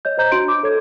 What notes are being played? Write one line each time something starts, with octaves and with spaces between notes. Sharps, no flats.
C#5 D#5 G6
C5 D#5 A#5 G6
D4 F#4 C6 D7
D6
A4 C#5 G#6